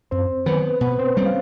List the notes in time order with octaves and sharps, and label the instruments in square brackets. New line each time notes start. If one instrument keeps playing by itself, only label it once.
[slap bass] F#2 [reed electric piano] C4 C5
[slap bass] D#3 F#3 [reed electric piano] B3 B4
[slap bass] B2 [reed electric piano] B3 B4
[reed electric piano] C4 C5
[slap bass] G3 C4 [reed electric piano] C#4 C#5
[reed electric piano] F5